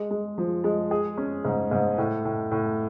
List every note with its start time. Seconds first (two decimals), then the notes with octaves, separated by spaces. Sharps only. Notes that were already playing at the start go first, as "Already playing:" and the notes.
Already playing: G#3
0.11 G#3
0.38 F3
0.64 G#3
0.91 G#4
1.17 C#4
1.45 G#2
1.71 G#2
1.98 A2
2.25 A2
2.51 A2